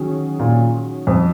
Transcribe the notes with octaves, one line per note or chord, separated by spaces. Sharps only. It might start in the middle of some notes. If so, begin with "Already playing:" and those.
Already playing: D#3 F#3 C#4 G#4
A#2
F2